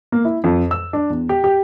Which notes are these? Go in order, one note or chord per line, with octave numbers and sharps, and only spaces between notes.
A#3
E4
F2
E6
D4
E2
G4
G4